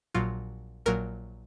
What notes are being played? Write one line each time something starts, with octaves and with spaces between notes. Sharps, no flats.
A#1 A#2 F#3 F4
A#1 A#2 F#3 A#4